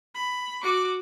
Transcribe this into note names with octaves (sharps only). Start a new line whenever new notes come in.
B5
F#4 D6